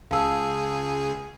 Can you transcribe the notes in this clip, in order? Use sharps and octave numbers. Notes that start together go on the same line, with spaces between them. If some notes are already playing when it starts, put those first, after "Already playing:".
C#2 G#4 F5 A5 E6